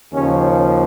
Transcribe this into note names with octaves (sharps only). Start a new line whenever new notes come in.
D#2 C#3 F3 C#4